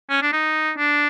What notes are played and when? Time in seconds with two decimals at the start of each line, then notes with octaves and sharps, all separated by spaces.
0.09 C#4
0.22 D4
0.32 D#4
0.78 D4